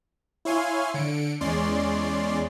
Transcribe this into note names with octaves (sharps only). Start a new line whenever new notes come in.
E4 C#5 F5 G#5 C6
D3 C#7 D7
E2 G#3 C#4 D5 C6